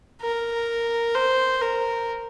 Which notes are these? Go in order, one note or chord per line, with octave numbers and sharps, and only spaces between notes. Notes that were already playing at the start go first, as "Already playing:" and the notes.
A#4
C5
A#4